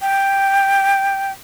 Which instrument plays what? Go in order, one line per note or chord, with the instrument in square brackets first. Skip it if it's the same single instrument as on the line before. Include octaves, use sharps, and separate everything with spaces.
[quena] G5